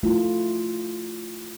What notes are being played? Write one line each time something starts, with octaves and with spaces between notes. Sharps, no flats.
A3 E4 F4